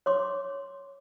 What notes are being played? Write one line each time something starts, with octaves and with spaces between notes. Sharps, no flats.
C#5 C6 D6